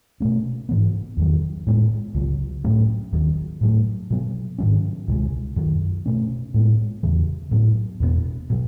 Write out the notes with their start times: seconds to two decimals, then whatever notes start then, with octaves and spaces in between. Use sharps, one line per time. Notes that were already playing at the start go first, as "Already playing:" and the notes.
0.20 B2 A3 C#4
0.69 G#2 E3 B3
1.17 E2 D#3 F#3
1.66 A2 G#3 B3
2.14 C#2 C#3 F#3
2.64 A2 F#3 A3 C#4
3.12 D#2 D#3 F#3
3.61 A2 F#3 A3
4.10 B2 F#3 B3
4.58 G#2 D#3 F#3 C#4
5.08 C#2 B2 G#3
5.56 F#2 D#3 F#3
6.06 B2 A3 C#4
6.54 A2 G#3 B3
7.03 E2 C#3 E3
7.51 A2 F#3 B3
8.00 E2 B2 G#3 B3
8.50 B2 F#3